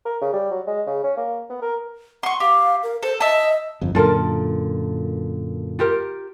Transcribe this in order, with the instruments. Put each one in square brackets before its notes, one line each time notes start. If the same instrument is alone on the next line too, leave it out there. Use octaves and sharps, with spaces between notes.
[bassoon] A#4
C#3
G3
F#3
G#3
C#3
C#4
A#3
B3
A#4
[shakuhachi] F#5 [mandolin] C6 C#6
[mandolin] G4 [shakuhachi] F5
[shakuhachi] A#4
[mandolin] A4 [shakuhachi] C5
[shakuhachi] D#5 [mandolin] E5 A5
[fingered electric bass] G1 F2
[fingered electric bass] F#2 A#2 D3 [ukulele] F4 A4 A#4
[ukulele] F4 G4 A#4